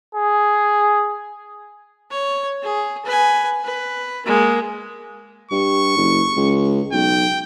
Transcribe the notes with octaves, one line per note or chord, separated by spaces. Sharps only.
G#4
C#5
G#4
B4 G#5
B4
G#3 A#3
G2 C#6
F#1
C#2
B1 G5